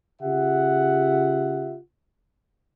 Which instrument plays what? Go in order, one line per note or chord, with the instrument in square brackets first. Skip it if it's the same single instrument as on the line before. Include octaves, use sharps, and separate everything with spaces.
[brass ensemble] C#3 F4 G4 E5 F#5